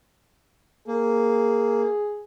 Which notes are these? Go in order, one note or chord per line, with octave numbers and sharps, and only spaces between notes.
A#3 G#4